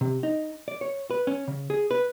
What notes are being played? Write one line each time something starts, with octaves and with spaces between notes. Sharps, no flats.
C3
D#4
D5
C#5
B4
C#4
C#3
G#4
B4